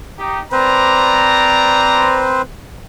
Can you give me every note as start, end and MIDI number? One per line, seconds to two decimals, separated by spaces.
0.18 0.40 63
0.18 0.40 67
0.52 2.42 60
0.52 2.42 71
0.52 2.42 72
0.52 2.33 74
0.52 2.33 82